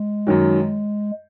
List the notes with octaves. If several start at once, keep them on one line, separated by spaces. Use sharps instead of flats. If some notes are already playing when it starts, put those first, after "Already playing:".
Already playing: G#3
F#2 D#3 F#3